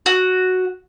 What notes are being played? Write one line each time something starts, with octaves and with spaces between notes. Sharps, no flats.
F#4